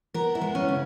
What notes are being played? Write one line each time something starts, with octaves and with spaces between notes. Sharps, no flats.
B3 A#4
E4
G#3
C#4
C#3